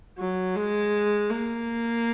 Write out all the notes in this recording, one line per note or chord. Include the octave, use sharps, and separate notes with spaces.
F#3
G#3
A#3